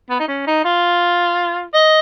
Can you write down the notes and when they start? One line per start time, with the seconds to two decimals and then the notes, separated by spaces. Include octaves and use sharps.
0.10 B3
0.20 D#4
0.28 C#4
0.47 D#4
0.65 F4
1.74 D#5